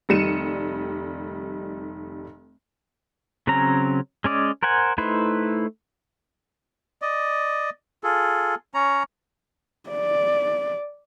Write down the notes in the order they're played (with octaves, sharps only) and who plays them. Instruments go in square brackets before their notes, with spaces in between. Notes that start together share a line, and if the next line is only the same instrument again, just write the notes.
[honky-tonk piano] F1 D#3 G3 C#7 D#7 E7
[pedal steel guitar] C#3 F#3 C4 C#4 A#5
G#3 C#4 D5 D#5
A#4 C5 F#5 G#5
A3 D#4 E4 B4 C5
[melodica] D5 D#5
F4 G#4 A4
C#4 C#5 A#5
[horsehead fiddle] D5